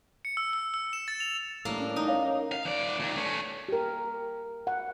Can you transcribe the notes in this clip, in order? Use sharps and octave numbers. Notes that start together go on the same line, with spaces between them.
C#7
E6
E6
E6
E7
A6
F7
A2 G3 A#3 D4
C#4
D#4
C#5 F5
F5
D#2 D5
A#2 D#3
A3 C#4
G4 A#4
F#5